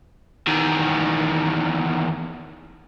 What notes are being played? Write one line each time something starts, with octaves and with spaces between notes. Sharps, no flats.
E2 D#3